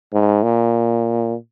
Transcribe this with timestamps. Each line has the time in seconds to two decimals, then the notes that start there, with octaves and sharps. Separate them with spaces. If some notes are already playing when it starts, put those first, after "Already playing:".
0.13 G#2
0.43 A#2